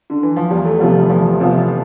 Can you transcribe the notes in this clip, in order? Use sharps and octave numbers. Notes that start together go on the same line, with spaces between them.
D3
E3
F3
E2 G3
A3
G3
C3 F3 A3 B3 F4
G3
E2 F3
C3 F3 B3 F4